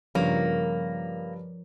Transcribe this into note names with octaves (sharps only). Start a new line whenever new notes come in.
G2 C#3 F3 A#3 A#4 C#5